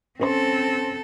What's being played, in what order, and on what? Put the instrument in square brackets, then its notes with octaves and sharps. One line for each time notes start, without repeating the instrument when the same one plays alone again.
[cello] C4 A4 [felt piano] C#4 C5 C6